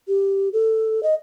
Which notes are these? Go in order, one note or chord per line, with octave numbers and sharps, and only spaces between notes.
G4
A4
D#5